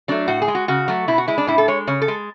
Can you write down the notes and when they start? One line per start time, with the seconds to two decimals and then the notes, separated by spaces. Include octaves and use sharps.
0.08 F#3 A3 D4
0.28 A2 F#4
0.42 G#4
0.48 G#3
0.55 F#4
0.68 C#3 F#4
0.88 F#3 A3
1.08 B2 E4
1.18 F#4
1.28 G#3 E4
1.38 D4
1.47 A2 E4
1.58 A4
1.68 G#3 C#5
1.87 C#3 C#5
2.02 A4
2.08 G#3